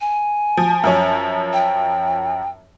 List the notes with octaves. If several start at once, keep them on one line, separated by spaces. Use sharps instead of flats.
G#5
F3
F#2 F3 C#4
G5